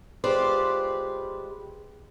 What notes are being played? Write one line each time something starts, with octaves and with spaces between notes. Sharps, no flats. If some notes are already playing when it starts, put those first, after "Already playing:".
G#3 F4 G4 B4 C5 D5